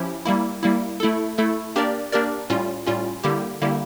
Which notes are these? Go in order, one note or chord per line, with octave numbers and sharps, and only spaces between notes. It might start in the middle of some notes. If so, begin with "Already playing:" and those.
Already playing: F3 C#4 E4 G4
G3 A#3 E4
G3 A#3 E4
A3 E4 A4
A3 E4 A4
A#3 D4 G4 A#4 D5
A#3 D4 G4 A#4 D5
A2 G3 C#4 F4
A2 G3 C#4 F4
D3 G3 A#3 E4 G4
D3 G3 A#3 E4 G4